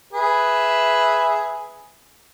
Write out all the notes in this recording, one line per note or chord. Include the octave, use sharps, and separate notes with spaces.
G#4 B4 E5